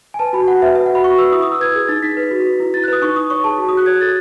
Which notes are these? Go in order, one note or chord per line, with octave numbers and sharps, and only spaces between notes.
G#5
B4 A5
F#4 B5
F#4 F#5
B4 E5
B4 E5
F#5
F#4
B5
F#4 C#6
B4 E6
E4 D#6
D#6
E4 E6
B4 G#6
G#4
D#4 A6
D#4 B6
B4
F#4
B4
E4
E4 A6
F#6
B4 D#6
D#4 C#6
D#4 D#6
C#5 C#6
G#4 A5
F#4
D#6
F#4 F#6
C#5 G#6
A4 A6